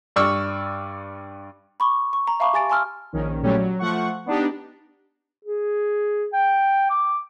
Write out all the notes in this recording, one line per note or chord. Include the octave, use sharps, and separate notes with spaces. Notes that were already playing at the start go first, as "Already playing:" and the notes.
G2 D5 C#6 E6 F6
B5 C#6 D6
C#6
A#5
E5 F5 A5 B5 C#6 D6
G4 G#5 A6 D7
G#5 A5 C6 E6 F6
A#1 D#3 C#4
A#2 F#3 G3 A3 C#4 G4
F#3
F3 A3 F#5 C#6
B3 D4 D#4 G4
G#4
G5
D6